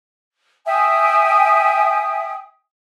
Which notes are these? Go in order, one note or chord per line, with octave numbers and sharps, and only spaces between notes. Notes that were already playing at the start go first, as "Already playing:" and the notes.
E5 G5 G#5 D#6